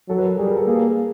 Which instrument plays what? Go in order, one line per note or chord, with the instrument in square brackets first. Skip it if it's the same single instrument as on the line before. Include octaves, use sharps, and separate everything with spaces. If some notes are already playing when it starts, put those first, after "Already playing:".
[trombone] F#3 [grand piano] A4
[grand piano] B4
A#4
[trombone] G3 [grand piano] G#4
[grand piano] A#4
A4
[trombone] A#3 [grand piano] G#4